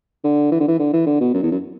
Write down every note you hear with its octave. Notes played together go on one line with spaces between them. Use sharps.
D3
E3
D3
E3
D3
E3
D3
B2
F#2
E2
F#2